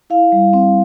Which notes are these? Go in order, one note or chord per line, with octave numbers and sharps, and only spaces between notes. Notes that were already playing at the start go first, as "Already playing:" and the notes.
E4 F5
G3
C4